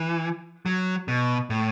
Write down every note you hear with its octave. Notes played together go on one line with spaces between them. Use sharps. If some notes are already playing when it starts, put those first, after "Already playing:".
Already playing: E3
F#3
B2
A2